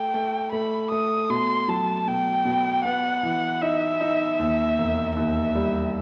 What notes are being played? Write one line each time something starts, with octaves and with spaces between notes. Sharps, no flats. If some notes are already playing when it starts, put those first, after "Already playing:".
Already playing: A3 G5
A3
A3 B5
A3 D#6
B2 C6
F#3 A5
B2 G5
B2
B3 F#5
E3
D#4 E5
D#4
D#2
E1
D#2 E5
G3